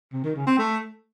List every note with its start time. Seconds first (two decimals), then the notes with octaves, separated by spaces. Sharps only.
0.13 C3
0.24 D#3
0.35 C#3
0.47 C4
0.58 A3